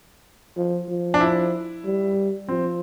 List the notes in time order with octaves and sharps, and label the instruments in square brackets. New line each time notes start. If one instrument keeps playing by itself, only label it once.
[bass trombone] F3
F3
[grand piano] D4
E4
[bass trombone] G3
[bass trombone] F3 [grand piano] C4